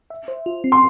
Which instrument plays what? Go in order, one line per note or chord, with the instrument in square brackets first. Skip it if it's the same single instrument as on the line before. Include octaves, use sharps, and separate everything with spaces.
[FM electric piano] E5
C5
F4
C4
[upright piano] C6